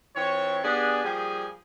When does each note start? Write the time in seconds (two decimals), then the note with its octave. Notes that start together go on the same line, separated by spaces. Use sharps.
0.16 E3 C4 F4 C#5
0.63 B3 D4 G4 G#4
1.04 F3 G3 A#3 G#4